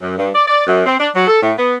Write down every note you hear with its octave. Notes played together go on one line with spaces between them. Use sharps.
F#2
G2
D5
D5
F#2
C4
D4
F#3
A4
A2
B3